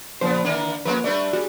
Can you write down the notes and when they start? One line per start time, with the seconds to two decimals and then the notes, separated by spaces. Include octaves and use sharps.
0.21 A#2 C#3 F3 B3 C5
0.45 D3 D#3 A#3 D4
0.85 F3 G#3 A#3 C#4 B4
1.04 G3 A3 D4 B4 D5
1.33 G3 F#4 G#4